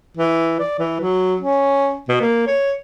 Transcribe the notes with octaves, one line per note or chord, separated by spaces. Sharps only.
E3
D5
E3
F#3
C#4
B2
A#3
C#5